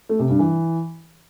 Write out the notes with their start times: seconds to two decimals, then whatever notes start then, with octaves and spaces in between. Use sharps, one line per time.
0.09 A3
0.19 C3
0.29 G2
0.39 E3